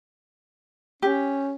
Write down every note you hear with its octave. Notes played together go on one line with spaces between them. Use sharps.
C#4 G4